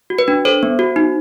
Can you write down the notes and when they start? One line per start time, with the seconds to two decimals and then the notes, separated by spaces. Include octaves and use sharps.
0.10 F#4
0.19 B4
0.28 D4
0.45 A4 C5
0.63 B3
0.79 F#4
0.96 D#4